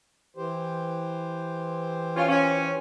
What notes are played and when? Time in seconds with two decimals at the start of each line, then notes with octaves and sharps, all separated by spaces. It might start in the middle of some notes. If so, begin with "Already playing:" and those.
0.37 E3 G4 C5
2.16 C#4 F4
2.29 C#4